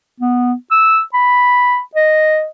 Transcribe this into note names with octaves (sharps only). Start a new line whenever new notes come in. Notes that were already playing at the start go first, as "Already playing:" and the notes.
B3
E6
B5
D#5